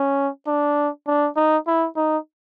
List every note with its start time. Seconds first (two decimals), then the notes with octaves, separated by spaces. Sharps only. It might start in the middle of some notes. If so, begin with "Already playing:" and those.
Already playing: C#4
0.47 D4
1.08 D4
1.36 D#4
1.67 E4
1.96 D#4